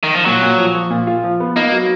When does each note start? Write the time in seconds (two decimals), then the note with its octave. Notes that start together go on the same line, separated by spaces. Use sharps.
0.03 D#3
0.14 F3
0.25 A#2 F#3
0.42 A#2
0.57 F3
0.75 F3
0.90 A#2
1.07 F4
1.24 F3
1.40 B3
1.56 A#3 D#4
1.72 F#3